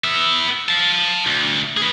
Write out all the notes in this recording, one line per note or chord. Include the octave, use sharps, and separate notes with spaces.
B3 E5
F5 A5
D2
G#4 B4